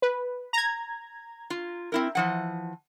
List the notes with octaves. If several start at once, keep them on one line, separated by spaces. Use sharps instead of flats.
B4
A#5 G#6
F4
C4 E4 A#4
E3 F3 F#5